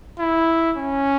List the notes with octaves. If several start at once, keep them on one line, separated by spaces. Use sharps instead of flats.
E4
C#4